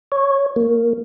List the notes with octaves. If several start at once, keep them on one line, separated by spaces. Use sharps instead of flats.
C#5
A#3